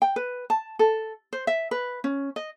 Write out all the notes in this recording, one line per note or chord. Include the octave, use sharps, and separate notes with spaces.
G5
B4
A5
A4
C5
E5
B4
C#4
D#5